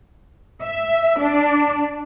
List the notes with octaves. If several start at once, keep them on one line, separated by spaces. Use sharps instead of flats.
E5
D4